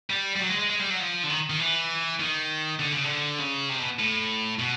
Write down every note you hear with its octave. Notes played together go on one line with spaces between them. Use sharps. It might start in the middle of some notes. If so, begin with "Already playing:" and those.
G3
G3
F#3
G#3
G#3
G#3
G3
F#3
F3
D3
D#3
D#3
E3
D#3
D3
C#3
D3
C#3
C3
B2
A2
B2